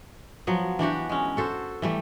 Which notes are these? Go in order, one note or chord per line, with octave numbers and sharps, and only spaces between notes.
F3 F#3 B3
E3 D4 F#4 G4
G#3 C#4
F#4 A4 C5
E3 G3 A3